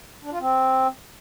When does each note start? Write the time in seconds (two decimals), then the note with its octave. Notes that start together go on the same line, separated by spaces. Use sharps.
0.22 D4
0.31 F4
0.40 C4